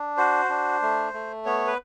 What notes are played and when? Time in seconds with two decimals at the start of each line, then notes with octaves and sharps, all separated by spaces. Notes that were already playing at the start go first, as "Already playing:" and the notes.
Already playing: D4
0.17 F#4 C5
0.49 D4
0.82 A3
1.14 A3
1.45 B3 C#5
1.67 B4